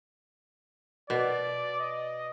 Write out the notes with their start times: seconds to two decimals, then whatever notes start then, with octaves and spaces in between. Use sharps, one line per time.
1.10 B2 D5
1.80 D#5